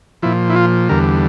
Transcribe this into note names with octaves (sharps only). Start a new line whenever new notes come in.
A#2 F3 E4
E4
F4
E2 D3 G3 A#4